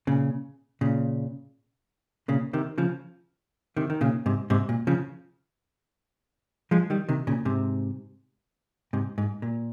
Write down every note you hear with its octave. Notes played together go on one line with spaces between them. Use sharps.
A#2 C#3
A#2 C#3
A#2 C#3
C3 D#3
C#3 F3
C3 D#3
D#3
A#2 C#3
G#2 C3
G#2 C3
A#2
C#3 F3
F3 G#3
D#3 G3
C3 D#3
A#2 C#3
G#2 C3
G#2 C3
G#2
A#2